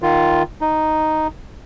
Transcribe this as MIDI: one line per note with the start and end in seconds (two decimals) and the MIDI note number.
0.02 0.43 51
0.02 0.43 65
0.61 1.27 63